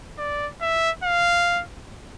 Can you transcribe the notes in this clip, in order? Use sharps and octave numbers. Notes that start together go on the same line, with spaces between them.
D5
E5
F5